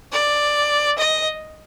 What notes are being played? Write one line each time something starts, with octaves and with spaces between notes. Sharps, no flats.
D5
D#5